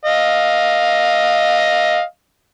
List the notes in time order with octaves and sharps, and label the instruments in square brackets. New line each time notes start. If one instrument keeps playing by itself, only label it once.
[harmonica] D#5 F5